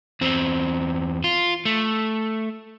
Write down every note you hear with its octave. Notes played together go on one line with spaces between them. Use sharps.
E2 C4
F4
A3